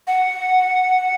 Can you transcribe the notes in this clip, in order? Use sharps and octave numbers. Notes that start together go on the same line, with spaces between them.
F#5